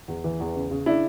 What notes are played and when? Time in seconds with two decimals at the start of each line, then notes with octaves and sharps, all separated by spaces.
0.08 E2
0.24 E3
0.40 E2
0.56 C#3
0.71 C#3
0.86 C#3 D4 E4